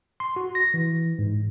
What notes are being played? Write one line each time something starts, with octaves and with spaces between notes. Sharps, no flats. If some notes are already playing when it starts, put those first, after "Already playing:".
C6
F#4
A#6
E3
G#2